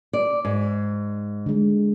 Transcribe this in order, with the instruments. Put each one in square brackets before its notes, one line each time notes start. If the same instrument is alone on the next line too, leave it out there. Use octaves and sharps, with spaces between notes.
[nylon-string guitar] D5
G#2
[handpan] D3 G#3